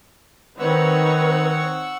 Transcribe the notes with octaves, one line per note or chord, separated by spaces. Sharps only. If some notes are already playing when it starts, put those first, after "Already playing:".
D#3 C4 D#4 B4 C#5 F#5 C#6 E6